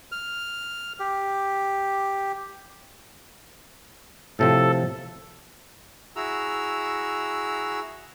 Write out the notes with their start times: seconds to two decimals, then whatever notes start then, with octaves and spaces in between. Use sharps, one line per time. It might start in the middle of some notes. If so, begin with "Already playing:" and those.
0.12 F6
0.99 G4
4.39 A2 C3 F3 A4
6.16 E4 F#4 G#4 A#5 E6